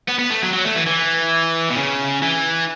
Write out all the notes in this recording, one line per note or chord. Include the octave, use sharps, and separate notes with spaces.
B3
B3
A3
F#3
F#3
A3
E3
E3
B2
C#3
E3